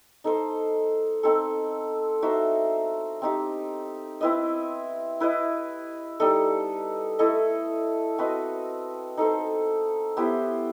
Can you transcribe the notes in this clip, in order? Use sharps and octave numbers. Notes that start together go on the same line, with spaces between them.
D#4 A4 C5
C4 D#4 A4
D#4 F#4 C5 E5
C4 D#4 G4
C4 E4 B4 D#5
E4 B4 D#5
G3 D#4 A4 D#5
A3 E4 A4 D#5
C4 F#4 B4 D#5
D#4 A4 C5
B3 E4 G4 C5